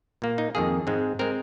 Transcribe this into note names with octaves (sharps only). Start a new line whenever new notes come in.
A#2 A#3
D#4
F2 D#3 A#3 G#4
G#2 G#3 C4
G#3 C4 A#4